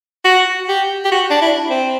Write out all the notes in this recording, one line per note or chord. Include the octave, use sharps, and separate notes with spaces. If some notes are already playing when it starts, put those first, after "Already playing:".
F#4
G4
G4
F#4
D4
E4
C4